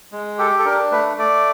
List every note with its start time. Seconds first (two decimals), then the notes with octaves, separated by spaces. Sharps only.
0.12 G#3
0.38 G4 A4
0.59 A4
0.65 D4 A#4
0.91 A3 B4
1.18 A3 D5